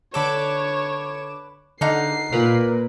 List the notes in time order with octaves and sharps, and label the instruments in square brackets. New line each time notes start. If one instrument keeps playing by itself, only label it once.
[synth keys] D3 D6 E7 [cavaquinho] A4 B4 [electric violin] C#5
[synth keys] D3 [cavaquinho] D#4 F5 F#5 [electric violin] C7
[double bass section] A#2 [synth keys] A#4 B4